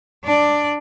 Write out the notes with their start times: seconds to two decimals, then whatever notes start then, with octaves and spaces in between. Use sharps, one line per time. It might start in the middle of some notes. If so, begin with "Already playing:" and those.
0.24 D4 D5